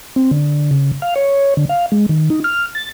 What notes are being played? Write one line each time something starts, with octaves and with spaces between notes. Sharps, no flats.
C4
D3
C#3
F5
C#5
D3
F5
G#3
D#3
D#4
F6
A6